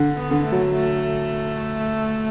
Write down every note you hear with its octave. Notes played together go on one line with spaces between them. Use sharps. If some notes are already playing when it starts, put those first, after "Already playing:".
Already playing: D3
B3
D3
A3
F#3
A3